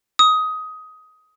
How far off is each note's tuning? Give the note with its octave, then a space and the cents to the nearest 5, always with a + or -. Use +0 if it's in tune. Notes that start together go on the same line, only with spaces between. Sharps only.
D#6 +15